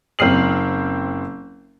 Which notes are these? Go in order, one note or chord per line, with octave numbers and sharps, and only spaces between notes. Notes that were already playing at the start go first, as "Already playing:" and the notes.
F#1 C4 F6 C7 F#7